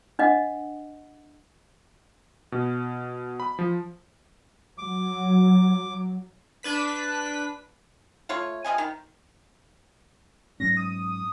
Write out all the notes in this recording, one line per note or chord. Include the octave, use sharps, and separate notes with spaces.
D4 D#5 F#5
B2
B5
F3
F#3 D6
D4 B4 B6
A3 F4 C#5
C3 F3 D#5 G#5
D#3
G#2 F#3 C#4 A#6
D#6